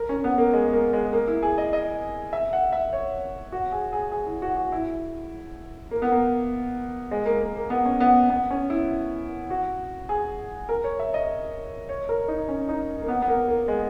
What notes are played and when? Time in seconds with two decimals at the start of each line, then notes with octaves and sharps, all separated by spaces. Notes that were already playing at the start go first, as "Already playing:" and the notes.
Already playing: A#4
0.09 C#4
0.24 B3
0.38 A#3
0.53 G#3
0.73 A#3
0.93 G#3
1.13 A#3
1.28 E4
1.43 G#4
1.58 D#5
1.73 D#5
2.33 E5
2.53 F#5
2.72 E5
2.93 C#5
3.52 F#4
3.72 G#4
3.93 G#4
4.12 G#4
4.27 E4
4.42 F#4
4.57 F#4
4.72 E4
5.91 A#3
6.02 B3
6.12 A#3
7.11 G#3
7.26 A#3
7.41 A#3
7.56 A#3
7.70 B3
7.85 C#4
8.00 B3
8.30 B3
8.51 C#4
8.70 E4
9.50 F#4
10.09 G#4
10.69 A#4
10.84 C#5
10.99 E5
11.14 D#5
11.89 C#5
12.09 A#4
12.28 D#4
12.49 C#4
12.69 D#4
13.02 A#3
13.08 B3
13.22 B3
13.28 A#3
13.48 A#3
13.68 G#3